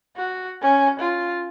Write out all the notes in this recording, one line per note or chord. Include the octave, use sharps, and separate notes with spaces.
F#4
C#4
F4